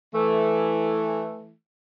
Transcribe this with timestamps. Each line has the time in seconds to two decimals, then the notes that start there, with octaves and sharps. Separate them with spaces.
0.13 E3 A3